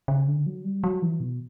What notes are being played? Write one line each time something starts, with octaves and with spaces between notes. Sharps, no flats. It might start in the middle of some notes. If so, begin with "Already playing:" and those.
C#3
D3
F#3
G3
F#3
E3
B2